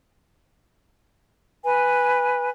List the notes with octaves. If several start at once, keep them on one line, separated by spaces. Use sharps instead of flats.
B4 G#5